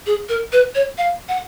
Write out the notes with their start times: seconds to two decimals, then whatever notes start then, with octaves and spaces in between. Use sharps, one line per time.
0.06 G#4
0.29 A#4
0.53 B4
0.75 C#5
0.98 F5
1.29 F#5